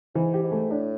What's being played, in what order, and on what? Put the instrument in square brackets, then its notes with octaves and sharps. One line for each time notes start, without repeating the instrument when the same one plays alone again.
[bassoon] G#2 [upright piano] E3
[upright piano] G4
[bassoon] G#2
[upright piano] A3
[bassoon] A2 [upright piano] D4